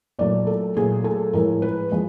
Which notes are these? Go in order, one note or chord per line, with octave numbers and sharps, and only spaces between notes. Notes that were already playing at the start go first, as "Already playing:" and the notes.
A#2 F#3 A3 D5
A4
A#2 F#3 A3 G#4
A4
A2 F3 G#3 A#4
B4
F3 G#3